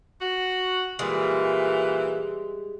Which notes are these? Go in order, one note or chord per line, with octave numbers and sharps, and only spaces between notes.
F#4
A#2 E3 G3 G#3